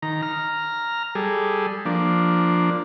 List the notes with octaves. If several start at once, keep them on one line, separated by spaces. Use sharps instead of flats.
D#3 A#5
A#5 F6
G3 G#4 A4
F3 A#3 D4